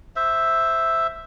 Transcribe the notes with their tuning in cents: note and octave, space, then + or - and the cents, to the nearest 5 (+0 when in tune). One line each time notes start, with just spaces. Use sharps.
C5 +0 E5 +0